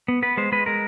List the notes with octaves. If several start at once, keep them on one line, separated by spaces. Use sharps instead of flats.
B3
B3 B4
G#3 C5
G#3 B4
G#3 A#4